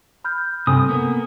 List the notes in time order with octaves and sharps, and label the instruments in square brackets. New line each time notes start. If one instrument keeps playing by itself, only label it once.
[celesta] B5 F6 G6
[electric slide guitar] G2 C3 [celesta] A4 G#5 B5 [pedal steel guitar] D#6
[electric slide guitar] A#3 B3